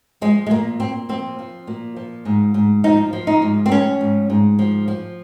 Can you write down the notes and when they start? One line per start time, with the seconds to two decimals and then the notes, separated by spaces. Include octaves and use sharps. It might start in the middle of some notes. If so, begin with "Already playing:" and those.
0.21 F3 G#3
0.46 G#3
0.51 A#2 A#3
0.80 A#2 C4
1.09 F3 C4
1.39 F3
1.67 A#2
1.96 F3
2.25 G#2
2.54 G#2
2.84 F3 D#4
3.13 F3
3.27 D#4
3.42 G#2
3.66 C4
3.71 F3 C#4
4.01 G#2
4.30 G#2
4.59 F3
4.88 F3